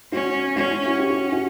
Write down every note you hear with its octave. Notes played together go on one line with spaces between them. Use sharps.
C#4 F#4
C#4 F#4
E4
F#4
C#4 G4
F#4
F#4